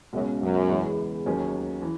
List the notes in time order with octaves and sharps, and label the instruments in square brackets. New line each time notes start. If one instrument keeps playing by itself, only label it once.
[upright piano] C#2 B2 G#3 C#4 F#4 [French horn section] F#2
[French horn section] F#2
[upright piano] E2 C#3 E3 G#3 B3
D#2 D#3 F#3 C#4 G#4
E3